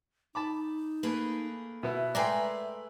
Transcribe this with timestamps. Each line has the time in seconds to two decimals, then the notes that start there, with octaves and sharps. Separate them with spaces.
0.35 D#4 A5 B5 D6
1.03 A3 A#3 G#4 B4
1.83 B2 B3 E4 E5
2.15 G#3 A3 A#4 B4 D5 G5 G#5 C6